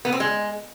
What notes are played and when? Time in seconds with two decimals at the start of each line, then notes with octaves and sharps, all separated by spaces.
0.05 B3
0.12 C4
0.20 G#3